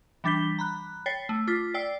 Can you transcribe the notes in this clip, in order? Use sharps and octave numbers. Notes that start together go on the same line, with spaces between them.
E3 G3 D4 G6 B6 G7
A#5 B5 F#6
C#5 G5 A6 B6 C7
A3
F4 D6 A6 B6
D5 G5 E6 C7